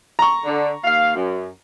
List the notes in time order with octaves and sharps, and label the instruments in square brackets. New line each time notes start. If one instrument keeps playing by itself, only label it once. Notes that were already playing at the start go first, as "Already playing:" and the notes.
[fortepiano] A#5 C#6
[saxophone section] D3
D#2 F5
F#2